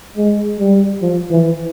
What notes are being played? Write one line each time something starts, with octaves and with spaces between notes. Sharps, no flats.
G#3
G3
F3
E3